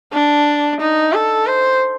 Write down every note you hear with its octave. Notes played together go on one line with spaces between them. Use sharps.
D4
D#4
A4
C5